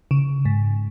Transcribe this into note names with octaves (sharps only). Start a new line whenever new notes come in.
C#3
G#2